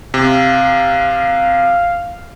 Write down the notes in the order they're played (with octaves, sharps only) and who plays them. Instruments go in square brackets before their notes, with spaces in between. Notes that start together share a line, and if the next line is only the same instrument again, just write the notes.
[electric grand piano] C3 [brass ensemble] F5